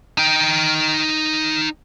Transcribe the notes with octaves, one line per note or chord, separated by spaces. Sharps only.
D#4 G5